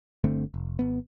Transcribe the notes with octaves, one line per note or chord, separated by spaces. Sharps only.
G1 D3 A3 C4
F1
G#1 B3